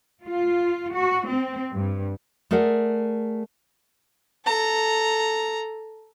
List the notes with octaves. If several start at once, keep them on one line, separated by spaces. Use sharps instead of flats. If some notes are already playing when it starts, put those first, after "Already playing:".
F4
F#4
C4
G2
A3 G#4 A#4 D5 F#5
A4 A#5